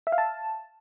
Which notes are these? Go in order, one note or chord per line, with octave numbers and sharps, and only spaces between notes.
E5
F5
A5